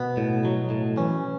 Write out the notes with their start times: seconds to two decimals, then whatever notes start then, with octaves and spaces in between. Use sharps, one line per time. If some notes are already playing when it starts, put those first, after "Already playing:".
Already playing: B2 B3
0.17 A2
0.45 F#3
0.70 A2
0.97 E3 C#4